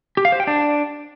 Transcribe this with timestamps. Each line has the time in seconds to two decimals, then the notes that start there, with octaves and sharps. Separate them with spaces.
0.17 G4
0.25 F5
0.32 C5
0.40 G5
0.47 D4